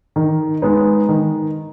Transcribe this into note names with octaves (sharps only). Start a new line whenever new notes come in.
D#3
G#3 B3 D#4
D#3